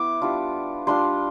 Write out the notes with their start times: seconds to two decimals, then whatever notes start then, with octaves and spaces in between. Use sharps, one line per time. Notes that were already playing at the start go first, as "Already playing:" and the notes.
Already playing: B3 E4 D6
0.22 G3 D4 F4
0.87 G3 D4 F4 C6